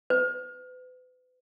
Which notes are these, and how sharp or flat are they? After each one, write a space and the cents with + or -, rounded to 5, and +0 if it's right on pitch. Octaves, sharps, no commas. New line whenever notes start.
B4 +40